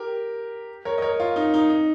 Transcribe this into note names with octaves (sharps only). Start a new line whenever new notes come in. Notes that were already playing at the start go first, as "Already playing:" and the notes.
Already playing: G4 A#4
A#4 C#5
D#5
A#4 C#5
F4
D#4
D#4
D#4